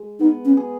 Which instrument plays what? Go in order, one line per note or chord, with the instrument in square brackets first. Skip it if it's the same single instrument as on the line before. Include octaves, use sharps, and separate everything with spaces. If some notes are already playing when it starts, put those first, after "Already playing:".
Already playing: [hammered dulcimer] G#3
[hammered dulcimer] B3 [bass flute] D#4
[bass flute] C#4
[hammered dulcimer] G#4